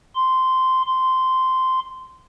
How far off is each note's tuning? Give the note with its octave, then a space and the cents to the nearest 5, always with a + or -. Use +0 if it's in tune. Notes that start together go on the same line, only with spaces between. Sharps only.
C6 -10
C6 -10